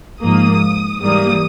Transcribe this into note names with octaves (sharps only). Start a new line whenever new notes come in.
G#2 F3 A#3 D#6
G#2 E3 G3 A#3 D#6